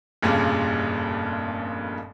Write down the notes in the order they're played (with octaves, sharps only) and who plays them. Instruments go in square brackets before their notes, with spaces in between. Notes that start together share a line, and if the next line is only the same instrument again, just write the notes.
[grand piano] F1 G2 A#2 C#3